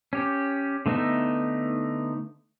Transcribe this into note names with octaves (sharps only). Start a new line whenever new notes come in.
C#4 G4
D3 A3 B3 D#4 E5